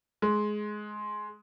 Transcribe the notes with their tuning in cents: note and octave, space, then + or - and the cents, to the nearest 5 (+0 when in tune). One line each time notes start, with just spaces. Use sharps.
G#3 +15